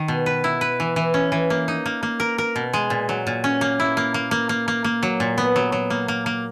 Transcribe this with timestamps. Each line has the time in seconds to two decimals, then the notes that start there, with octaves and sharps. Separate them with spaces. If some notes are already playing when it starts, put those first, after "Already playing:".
Already playing: D#3
0.08 B2
0.26 B4
0.44 E4
0.61 B4
0.80 E3
0.96 E3
1.14 C#4
1.32 E3
1.50 A#3
1.68 D#4
1.86 A#3
2.03 A#3
2.20 A#4
2.38 A#4
2.56 B2
2.73 G#3
2.90 A#2
3.09 F#3
3.27 A#2
3.44 C#4
3.61 A#3
3.80 E4
3.97 A#3
4.14 A#3
4.31 A#3
4.49 A#3
4.68 A#3
4.84 A#3
5.03 F#3
5.20 A#2
5.38 B3
5.56 F#3
5.72 F#3
5.90 A#3
6.08 A#3
6.26 A#3